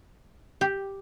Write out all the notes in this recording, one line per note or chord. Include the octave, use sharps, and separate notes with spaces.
G4